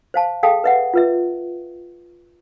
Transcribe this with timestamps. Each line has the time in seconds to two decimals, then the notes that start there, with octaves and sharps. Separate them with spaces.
0.14 C5 F5 A5
0.43 G#4 A4 F5 G5 A5 D#6
0.64 B4 E5 F#5
0.94 F4 B4 E5